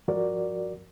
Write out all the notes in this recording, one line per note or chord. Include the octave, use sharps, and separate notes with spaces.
G2 F3 F#4 A#4 D5